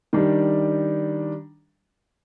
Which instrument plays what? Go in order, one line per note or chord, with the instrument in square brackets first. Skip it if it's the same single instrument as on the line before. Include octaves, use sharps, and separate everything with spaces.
[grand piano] D#3 G3 D4